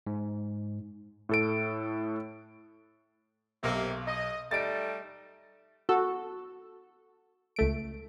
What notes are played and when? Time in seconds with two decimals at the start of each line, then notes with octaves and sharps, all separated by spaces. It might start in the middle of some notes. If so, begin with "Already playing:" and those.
0.07 G#2
1.29 A2 A4 D7
3.63 B1 C3 A#3
4.07 D#5
4.51 G3 A3 D#4 A6 D7
5.89 F#4 A4
7.56 C#2 A3 D7